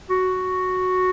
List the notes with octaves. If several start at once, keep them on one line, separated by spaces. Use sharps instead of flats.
F#4